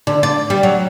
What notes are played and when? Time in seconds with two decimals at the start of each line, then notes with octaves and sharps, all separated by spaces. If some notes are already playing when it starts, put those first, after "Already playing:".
0.07 D3
0.23 D5
0.50 G3
0.63 F#3